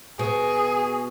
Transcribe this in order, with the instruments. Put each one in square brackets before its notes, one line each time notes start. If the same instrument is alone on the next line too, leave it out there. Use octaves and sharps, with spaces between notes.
[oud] B2 [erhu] G#4